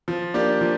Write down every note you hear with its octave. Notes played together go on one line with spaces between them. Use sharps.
F3
A#3 D4 G4 D5
F3